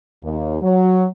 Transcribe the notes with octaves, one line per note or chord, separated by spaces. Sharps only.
D#2
F#3